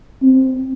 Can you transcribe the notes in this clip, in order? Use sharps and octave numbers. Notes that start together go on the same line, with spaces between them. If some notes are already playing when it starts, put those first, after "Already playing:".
C4